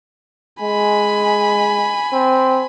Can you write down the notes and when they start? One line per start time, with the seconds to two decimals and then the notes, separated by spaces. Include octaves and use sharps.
0.62 G#3 G#5 B5
2.13 C4